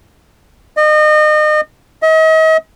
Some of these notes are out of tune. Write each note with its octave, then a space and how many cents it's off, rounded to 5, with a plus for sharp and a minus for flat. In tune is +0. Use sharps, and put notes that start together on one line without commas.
D#5 -35
D#5 +40